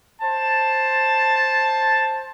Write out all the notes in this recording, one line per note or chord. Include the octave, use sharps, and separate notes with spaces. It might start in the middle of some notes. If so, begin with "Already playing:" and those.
C5 A5